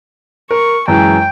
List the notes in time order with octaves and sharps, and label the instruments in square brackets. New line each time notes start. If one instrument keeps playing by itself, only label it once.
[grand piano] A#4 [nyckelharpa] C#6
[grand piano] F#2 E3 G#3 [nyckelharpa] G5